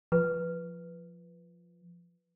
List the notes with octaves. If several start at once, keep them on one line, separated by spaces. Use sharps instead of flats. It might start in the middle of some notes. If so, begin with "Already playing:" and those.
F3 B4